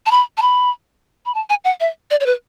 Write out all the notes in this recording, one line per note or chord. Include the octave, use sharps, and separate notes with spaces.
A5
B5
A5
B5
B5
A5
G#5
F#5
E5
D5
C#5
B4